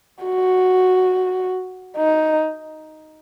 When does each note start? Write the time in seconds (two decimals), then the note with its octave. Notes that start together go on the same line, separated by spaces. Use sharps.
0.24 F#4
1.97 D#4